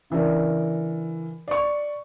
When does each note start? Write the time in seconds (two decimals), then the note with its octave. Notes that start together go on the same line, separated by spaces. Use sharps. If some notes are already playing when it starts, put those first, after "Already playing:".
0.10 C#3 E3 D4 A#4
1.48 D5 C#6